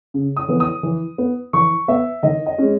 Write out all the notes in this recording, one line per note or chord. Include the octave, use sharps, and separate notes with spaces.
C#3
D#6
E3 B3
D#6
E3
B3
E3 C#6
B3 E5
D#3 D#5
D#5
G#3 C#4